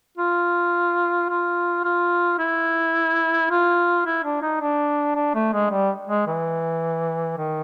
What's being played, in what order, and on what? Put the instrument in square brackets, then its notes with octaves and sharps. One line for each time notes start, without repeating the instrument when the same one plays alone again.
[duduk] F4
F4
F4
E4
F4
E4
D4
D#4
D4
D4
A3
G#3
G3
G#3
E3
D#3